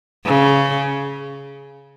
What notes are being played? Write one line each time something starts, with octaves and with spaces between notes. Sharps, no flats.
C#3